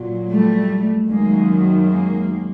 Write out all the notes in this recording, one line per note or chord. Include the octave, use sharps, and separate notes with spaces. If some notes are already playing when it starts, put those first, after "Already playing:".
Already playing: A#2 F#3
G3 A3
F#2 D#3 F#3 G#3 A#3
G#3 A#3